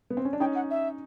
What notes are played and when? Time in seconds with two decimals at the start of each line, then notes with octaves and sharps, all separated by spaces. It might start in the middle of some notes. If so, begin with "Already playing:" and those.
0.10 B3
0.17 C4
0.25 C#4
0.33 D4
0.40 C#4 D#4 G5
0.55 F#5
0.70 E5